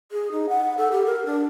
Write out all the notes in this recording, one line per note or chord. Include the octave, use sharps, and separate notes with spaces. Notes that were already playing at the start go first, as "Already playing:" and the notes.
G#4
D#4
F#5
A4
G4
A#4
D4